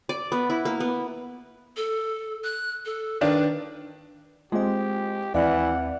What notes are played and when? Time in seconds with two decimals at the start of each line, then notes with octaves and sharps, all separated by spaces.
0.09 D5
0.32 B3
0.50 E4
0.65 A#3
0.80 B3
1.77 A4
2.44 F#6
2.85 A4
3.21 D#3 D4 B4
4.52 G#3 C4 F4 G4 D#5
5.34 D#2 E3 C4 D5 F5 F#5